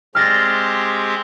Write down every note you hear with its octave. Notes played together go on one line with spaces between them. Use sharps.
G#3 C4 G4 F6 A6 A#6